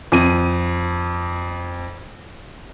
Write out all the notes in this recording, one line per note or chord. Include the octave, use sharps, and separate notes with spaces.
F2 D#7